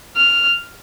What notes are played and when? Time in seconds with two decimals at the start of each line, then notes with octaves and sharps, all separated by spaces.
0.16 F6